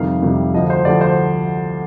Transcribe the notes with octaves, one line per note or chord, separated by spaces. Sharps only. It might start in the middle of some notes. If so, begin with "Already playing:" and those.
Already playing: F2 C3 D#3 G3 F5
F2 C3 D#3 G3
D2 D3 F3 D#5
C5
D2 D3 F3 D5
C5